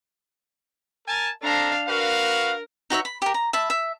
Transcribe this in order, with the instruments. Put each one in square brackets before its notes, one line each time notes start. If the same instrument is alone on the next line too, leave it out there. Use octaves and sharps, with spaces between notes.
[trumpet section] A#4 G#5 A5
[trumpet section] C4 A4 A#5 [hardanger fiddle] D4 F5
[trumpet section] F#4 B4 F5 [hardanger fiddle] A#4
[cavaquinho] D#4 F#4 C#5 E5
B5
G4 A#4
A#5
E5 A5 B5
E5